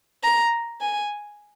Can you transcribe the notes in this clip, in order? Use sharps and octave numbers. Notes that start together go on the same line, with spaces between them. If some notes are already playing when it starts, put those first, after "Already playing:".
A#5
G#5